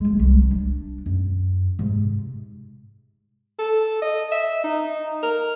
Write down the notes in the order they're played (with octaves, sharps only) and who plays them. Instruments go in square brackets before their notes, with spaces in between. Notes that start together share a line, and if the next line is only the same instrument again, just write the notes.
[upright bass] D1 G#3
C2 F#3
D4
F#2
G#2 C3
[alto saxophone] A4
D#5
E5
D#4
A#4